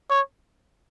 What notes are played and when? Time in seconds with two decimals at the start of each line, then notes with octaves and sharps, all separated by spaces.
0.10 C#5